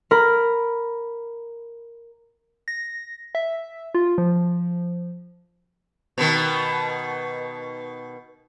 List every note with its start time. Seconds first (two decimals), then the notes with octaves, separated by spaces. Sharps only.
0.11 A#4 B5
2.68 A#6
3.35 E5
3.95 F4
4.18 F3
6.18 B2 D#3